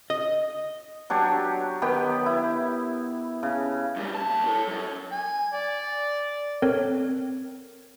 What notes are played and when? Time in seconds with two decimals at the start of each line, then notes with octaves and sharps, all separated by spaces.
0.10 D#5
1.10 F#3 D4 G4 C#5
1.82 D#3 B3 G4
2.26 E4
3.43 C#3
3.96 F#2 G3
4.15 D#2 A5
4.47 A4 C#5
4.67 F#3 C#4
5.12 G#5
5.54 D5
6.62 C4 A4 A#4 C#5